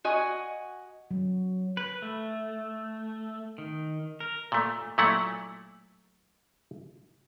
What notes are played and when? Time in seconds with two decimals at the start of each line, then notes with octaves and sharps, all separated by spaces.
0.04 F#4 D#5 G#5
1.11 F#3
1.77 B4
2.02 A3
3.58 D#3
4.20 A#4
4.52 A#2 A3
4.98 A#2 F#3 A3 E4 F#5